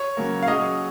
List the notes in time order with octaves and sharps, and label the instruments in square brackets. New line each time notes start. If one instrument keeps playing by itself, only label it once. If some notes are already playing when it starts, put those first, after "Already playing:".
Already playing: [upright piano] C#5
[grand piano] C#3 F#3 A#3
[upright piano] F5
[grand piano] F#3 C#4 G#4 [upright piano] D#5